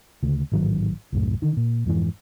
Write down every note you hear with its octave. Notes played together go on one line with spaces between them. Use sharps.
D2 C#3
A1 G#2 D#3 F#3
C2 F#2 A2
D3 D#3
A#2
F2 G#2 E3